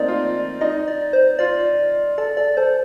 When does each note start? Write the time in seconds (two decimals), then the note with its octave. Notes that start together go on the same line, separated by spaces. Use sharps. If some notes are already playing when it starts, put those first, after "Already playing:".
Already playing: A3 A#3 C4 D#4 D5
0.08 F4
0.61 D#4 D#5
0.88 D5
1.13 C5
1.39 F4 D5
2.18 A4 D5
2.37 A4 D5
2.57 A4 C5